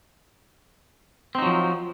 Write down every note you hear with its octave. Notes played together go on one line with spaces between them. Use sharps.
F3 F#3 C4 D#4